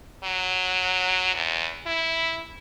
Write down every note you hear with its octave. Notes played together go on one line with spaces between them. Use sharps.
F#3
E2
E4